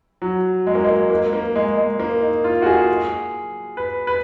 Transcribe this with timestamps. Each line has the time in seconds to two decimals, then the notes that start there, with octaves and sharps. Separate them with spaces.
0.22 F#3
0.67 G#3
0.75 A#3
0.84 G#3
1.10 A#3
1.33 A#3
1.56 G#3
1.78 G#3
2.00 A#3
2.22 D#4
2.44 F4
2.62 F#4
2.66 G#4
3.77 B4
4.07 B4